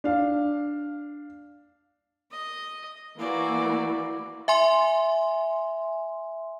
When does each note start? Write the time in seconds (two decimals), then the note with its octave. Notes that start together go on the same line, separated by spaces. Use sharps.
0.04 D4 F5
2.31 D#5
3.19 E3 A#3 F#4 D5
4.48 E5 G#5 C6